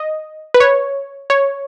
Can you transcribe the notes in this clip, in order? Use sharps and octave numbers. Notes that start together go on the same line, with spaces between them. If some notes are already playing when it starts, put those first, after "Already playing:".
Already playing: D#5
B4
C#5
C#5